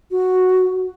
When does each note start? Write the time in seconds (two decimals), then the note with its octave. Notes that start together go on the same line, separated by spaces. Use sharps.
0.11 F#4